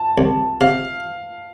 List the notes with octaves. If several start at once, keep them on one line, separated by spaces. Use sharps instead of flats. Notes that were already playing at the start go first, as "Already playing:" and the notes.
Already playing: A5
C2
C3 F5